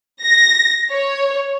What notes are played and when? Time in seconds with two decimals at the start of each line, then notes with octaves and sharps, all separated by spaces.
0.24 A#6
0.90 C#5